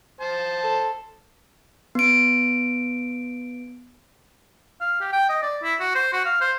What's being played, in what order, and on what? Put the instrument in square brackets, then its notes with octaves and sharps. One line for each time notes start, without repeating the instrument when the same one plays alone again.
[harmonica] C5 A5
[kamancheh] A4
[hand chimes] B3 D7
[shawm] F5
G4
G5
D#5
D5
E4
F#4
C5
F#4
F5
C5